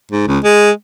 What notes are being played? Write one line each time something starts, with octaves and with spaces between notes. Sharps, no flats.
G#2
C#2
G#3